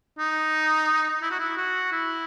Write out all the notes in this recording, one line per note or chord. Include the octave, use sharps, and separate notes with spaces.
D#4
E4
F#4
E4
F#4
E4